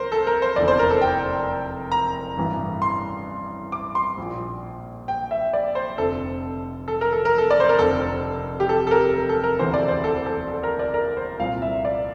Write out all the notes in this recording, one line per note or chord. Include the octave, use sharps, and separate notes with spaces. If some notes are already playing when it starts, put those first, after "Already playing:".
Already playing: C2 A#4 C5
A4
A#4
C5
F1 E2 D3 D5
C5
A#4
A4
G5
A#5
A1 G2 E3
C6
D6
C6
A#1 A#2
G5
E5
D5
C5
F1 F2 D3 A4
A4
A#4
A4
A#4
A4
D5
C5
A#4
F1 F2 D3 A4
G4
A4
A4
A#4
A#4
A4
A#4
E1 D2 C3 E3 C5
D5
C5
A4
A4
A4
A#4
D5
A#4
C5
C2 A#2 F5
E5
D5